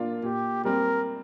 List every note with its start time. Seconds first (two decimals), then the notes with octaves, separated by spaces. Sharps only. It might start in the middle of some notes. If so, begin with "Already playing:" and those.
Already playing: A#2 A#3 D4 F4
0.23 A#2 G4
0.65 G3 C4 A#4